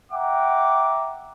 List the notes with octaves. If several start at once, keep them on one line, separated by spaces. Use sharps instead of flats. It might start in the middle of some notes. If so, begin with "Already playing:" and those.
E5 F#5 G5 A#5 D6